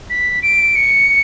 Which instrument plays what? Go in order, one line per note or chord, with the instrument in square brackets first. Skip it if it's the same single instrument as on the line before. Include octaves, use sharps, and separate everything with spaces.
[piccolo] B6
D7
C#7